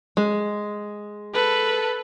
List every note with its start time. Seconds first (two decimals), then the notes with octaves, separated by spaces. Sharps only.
0.17 G#3
1.34 A4 B4